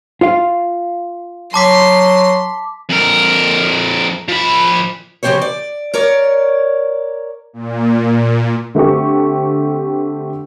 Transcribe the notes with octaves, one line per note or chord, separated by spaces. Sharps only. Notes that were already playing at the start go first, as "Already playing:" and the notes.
F4 F5
F#3 A5 C6 D6 B6
F2 A#4
F3 B5
C#3 F3 C4 G4 C5 C#5
D5
A#4 C#5 D5
A#2
D3 A3 C4 G4 C#6